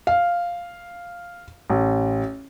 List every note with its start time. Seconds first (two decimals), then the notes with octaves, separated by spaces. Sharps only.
0.07 F5
1.70 A1